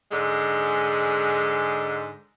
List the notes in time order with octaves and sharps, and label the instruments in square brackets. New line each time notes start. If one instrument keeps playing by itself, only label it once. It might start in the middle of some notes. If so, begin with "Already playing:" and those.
[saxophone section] G#2 D3 G#3